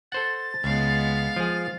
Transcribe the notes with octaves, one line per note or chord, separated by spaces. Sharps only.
A4 C5 F#5 A6
C#2 G#3 B3 F5
F3 G#4 A6